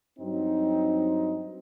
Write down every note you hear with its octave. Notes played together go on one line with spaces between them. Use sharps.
G2 F#3 C4 D#4